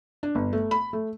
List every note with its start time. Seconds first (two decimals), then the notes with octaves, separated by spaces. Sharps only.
0.23 D4
0.35 G1
0.53 A3
0.71 B5
0.93 A3